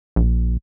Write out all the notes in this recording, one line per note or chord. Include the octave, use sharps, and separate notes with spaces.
A#1